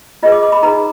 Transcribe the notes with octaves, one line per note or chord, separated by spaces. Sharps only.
F4 G#4 B4 D#5
D6
D6
B5
D#4 G#4 B4 A#5